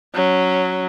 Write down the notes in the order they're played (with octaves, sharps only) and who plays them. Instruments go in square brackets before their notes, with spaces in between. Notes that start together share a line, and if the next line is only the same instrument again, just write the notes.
[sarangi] F#3 [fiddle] C#4